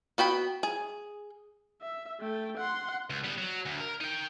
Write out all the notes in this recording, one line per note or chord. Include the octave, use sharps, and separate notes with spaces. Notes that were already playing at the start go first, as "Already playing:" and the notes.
B3 F#4 G5 B5
G#4
E5
A3 G5
F#5 C6
C#2
G3 B3
F#3
D2
A#4
D#4 G5